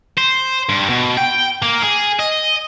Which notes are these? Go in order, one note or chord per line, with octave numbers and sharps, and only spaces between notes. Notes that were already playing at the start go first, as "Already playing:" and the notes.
C5
G2
B2
G5
A#3
G#4
D#5